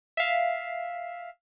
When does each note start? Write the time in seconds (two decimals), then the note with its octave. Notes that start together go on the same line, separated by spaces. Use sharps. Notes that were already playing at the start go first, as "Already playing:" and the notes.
0.17 E5 F5